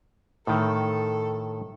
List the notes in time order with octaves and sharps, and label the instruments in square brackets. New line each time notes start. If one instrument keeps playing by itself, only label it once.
[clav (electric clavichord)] A2 D#3 [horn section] A4